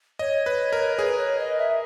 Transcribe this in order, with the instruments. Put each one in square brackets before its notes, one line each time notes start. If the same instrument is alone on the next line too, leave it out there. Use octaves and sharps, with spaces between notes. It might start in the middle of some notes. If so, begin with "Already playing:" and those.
[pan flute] C#5 [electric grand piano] D#5
[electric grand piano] B4
A#4
[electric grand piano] G#4 [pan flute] B4
[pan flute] C#5
D#5
E5